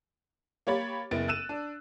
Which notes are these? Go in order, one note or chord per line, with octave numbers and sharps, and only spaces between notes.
A#3 G4 C#5 B5 A6
F#1 B3 E4 A6 D7
E6 F#6 A6 D#7 E7
D4